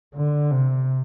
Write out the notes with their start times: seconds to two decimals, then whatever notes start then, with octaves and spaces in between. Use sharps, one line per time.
0.15 D3
0.51 C3